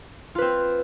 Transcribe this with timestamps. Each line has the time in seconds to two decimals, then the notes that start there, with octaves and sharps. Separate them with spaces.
0.35 F4
0.38 B4
0.42 C4